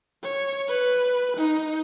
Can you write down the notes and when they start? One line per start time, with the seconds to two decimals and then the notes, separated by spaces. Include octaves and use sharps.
0.23 C#5
0.69 B4
1.37 D#4